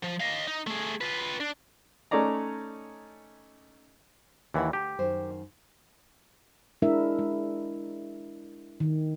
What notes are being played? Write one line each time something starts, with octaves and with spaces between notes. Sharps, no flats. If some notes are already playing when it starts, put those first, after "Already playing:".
F3
D#5 F5
D#4
A3 G#4
F4 B4
D4
A3 C#4 D#4 D5 A#5
D#2 E3 D4 E4 F#5
D2 G4 A5
F#2 D#3 C5
G#3 D4 E4 A#4 E5
G#3
D#3